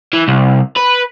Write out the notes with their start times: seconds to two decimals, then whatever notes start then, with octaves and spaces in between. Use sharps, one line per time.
0.13 E3
0.28 C2
0.77 B4